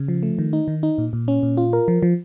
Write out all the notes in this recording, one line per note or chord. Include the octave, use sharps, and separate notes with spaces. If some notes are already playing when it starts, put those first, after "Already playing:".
Already playing: C#3
F3
A3
D#3
D#4
D#3
D#4
A#2
A#2
C#4
A#2
F4
A#4
F3
F3